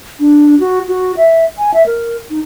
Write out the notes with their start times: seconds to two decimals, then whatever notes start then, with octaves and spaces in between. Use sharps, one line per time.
0.20 D4
0.60 F#4
0.88 F#4
1.17 E5
1.58 G#5
1.74 E5
1.86 A#4
2.30 D#4